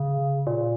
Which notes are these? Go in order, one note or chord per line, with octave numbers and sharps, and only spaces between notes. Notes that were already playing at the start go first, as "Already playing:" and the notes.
Already playing: C#3
A#2